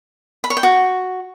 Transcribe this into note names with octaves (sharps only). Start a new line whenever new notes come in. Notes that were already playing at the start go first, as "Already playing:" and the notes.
B5
C#5
G5
F#4